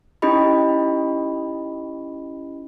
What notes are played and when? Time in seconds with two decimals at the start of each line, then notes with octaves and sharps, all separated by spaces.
0.22 C#4 D#4 E4 G4 D#5 B5